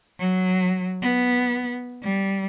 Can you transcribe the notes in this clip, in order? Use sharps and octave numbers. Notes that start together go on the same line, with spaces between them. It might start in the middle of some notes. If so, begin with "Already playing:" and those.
F#3
B3
G3